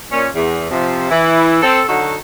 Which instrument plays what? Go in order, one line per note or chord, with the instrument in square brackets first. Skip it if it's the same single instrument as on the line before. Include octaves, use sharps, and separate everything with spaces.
[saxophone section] A#2 C#4
E2
C3 F3
E3 E4
C4 A4
D3 F#3 D#4 F#4 A4